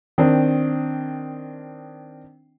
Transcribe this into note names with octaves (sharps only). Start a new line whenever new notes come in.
D#3 C4 D4